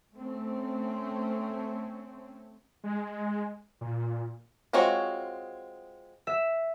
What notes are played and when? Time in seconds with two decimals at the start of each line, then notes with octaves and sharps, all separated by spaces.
0.16 A3 C4 C#4
2.84 G#3
3.81 A#2
4.73 G#3 C4 F4 F#4 C#5
6.27 E5